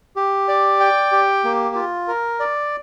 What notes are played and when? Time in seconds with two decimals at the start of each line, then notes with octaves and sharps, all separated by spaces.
0.16 G4
0.48 D5
0.80 G5
1.12 G4
1.44 A#3
1.75 F4
2.08 A#4
2.40 D5